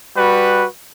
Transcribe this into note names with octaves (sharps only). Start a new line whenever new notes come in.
G3 F#4 B4